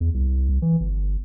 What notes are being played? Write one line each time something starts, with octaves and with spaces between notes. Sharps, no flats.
E2
C2
C2
E3
G1